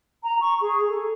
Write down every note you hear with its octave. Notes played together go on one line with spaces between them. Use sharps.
A#5
C#6
G#4
A4